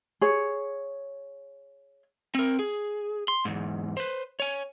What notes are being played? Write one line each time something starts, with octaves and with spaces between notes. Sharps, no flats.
G#4 C#5
C4 A#4
G#4
C6
E2 G#2
B4 C5
C#5 G#5